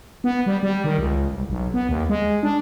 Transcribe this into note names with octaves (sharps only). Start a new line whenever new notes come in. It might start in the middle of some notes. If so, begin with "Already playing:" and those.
B3
G3
G3
D#3
C#2
C2
B1
B3
D#2
G#3
D4